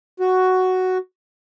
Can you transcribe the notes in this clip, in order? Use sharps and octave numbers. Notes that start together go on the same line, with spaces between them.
F#4